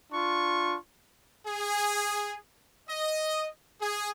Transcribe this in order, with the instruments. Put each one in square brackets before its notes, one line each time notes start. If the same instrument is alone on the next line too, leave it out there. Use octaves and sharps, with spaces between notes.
[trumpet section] D4 F4 C#6
G#4
D#5
G#4